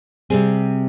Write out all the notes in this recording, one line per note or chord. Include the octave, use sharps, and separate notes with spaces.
C3 G3 C4 G#4